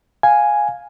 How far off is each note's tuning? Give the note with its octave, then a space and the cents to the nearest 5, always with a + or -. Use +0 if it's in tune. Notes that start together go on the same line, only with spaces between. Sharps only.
F5 +10 G#5 +0